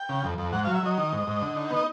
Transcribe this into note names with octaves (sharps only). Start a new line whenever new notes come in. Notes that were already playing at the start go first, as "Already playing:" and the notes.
Already playing: G5
C#3
F2
F2
G#2 F#5
F#3 F5
E5
F#3 D#5
D#3
G#2
G#2
D3
D#4
B3
D#5